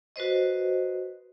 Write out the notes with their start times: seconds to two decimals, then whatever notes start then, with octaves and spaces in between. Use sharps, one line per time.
0.16 F#4 B4 C5 D#5